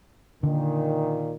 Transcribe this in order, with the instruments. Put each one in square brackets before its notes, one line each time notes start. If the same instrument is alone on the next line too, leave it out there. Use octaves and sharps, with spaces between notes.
[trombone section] A#2 D#3 [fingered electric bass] D3